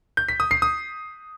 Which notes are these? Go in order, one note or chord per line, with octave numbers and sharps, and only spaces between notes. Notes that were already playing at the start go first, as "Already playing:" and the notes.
G6
B6
D#6
C7
D#6